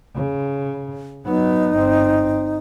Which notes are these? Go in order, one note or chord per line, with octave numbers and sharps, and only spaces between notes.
C#3
F#3 B3 D#4
G1 C4